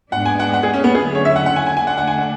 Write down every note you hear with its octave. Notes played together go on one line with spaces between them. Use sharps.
G#2 G#3 B3 D4 F#5
G#5
F#5
F#5
G#4
C#4
B3
D3 F#3 A3 C#4 E4 G#4
C#5
E5
F#5
F#5
G#5
G#5
D3 A3 D4 G#5
F#5
F#5
G#5
F#5